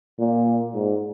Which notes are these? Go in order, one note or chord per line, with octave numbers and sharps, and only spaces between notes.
A#2
G#2